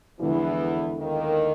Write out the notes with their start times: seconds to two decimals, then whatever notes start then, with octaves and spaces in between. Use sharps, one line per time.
0.19 E2 D3 E3 F3 G#3 B3 E4
0.98 D#2 D#3